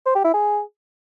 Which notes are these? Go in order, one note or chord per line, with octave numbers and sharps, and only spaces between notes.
C5
G4
E4
G#4